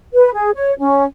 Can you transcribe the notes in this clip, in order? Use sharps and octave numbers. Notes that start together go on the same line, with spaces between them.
B4
G#4
C#5
C#4